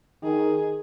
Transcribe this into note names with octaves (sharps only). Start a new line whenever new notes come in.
D#3 G#4